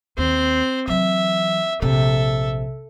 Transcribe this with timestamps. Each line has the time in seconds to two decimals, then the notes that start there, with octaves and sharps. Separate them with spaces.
0.18 D#2 C4 C5
0.88 E3 F#3 E5
1.82 A#1 C3 A4 E5